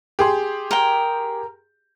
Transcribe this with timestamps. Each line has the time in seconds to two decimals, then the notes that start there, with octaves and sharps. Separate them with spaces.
0.19 G4 G#4 C6
0.71 A#4 G5